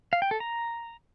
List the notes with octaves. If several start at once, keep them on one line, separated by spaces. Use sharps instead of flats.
F5
G5
A4
A#5